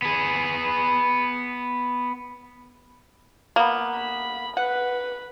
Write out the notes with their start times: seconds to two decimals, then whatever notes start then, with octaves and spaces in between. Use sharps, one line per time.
0.02 B3 G#4
3.56 A#3 B3
3.96 B5
4.57 B4 F#5